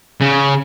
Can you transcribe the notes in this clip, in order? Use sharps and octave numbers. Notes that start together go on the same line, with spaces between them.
C#3